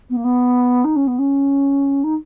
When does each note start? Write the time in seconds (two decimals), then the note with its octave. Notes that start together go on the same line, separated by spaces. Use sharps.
0.10 B3
0.16 A#3
0.24 B3
0.84 D#4
0.96 C#4
1.07 B3
1.18 C#4
2.04 D#4